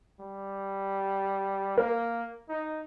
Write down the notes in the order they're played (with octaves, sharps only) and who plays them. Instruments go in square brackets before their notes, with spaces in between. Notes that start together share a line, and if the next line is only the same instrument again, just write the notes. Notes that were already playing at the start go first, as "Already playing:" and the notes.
[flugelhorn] G3
[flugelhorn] A#3 [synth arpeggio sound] A#4
[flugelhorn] D#4